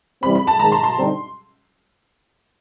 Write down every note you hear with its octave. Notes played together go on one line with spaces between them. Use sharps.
C3 E3 G3 C4 B5
B5
A5
G#2 D#3 G#3 A#5
C6
C6
D3 G3 C4 D#4